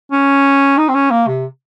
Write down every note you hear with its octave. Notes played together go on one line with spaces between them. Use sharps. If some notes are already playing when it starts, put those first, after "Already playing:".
C#4
D#4
C4
C#4
A#3
C3